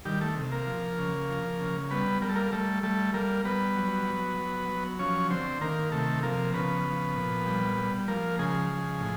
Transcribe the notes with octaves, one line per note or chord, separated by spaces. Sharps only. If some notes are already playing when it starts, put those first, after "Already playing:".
D#3 G3 G4
A3 A4
C3
A#3 A#4
F3
C#3
F3
C#3
G3 B3 B4
G3 A#4
A4
A#3 A#4
G3 A3 A4
G3 A3 A4
G3 A#3 A#4
G3 B3 B4
F#3
F#3
F#3
F#3
F3 C#4 C#5
D3 C4 C5
D#3 A#3 A#4
C3 A3 A4
F3 A#3 A#4
C#3 B3 B4
F3
A#2
G3
G3
F3 A#3 A#4
C#3 G#3 G#4
F3
A2